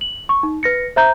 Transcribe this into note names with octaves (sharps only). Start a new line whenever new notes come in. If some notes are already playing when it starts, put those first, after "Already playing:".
F#7
C#6
D#4
B4 A#6 C#7
C5 E5 A#5 G6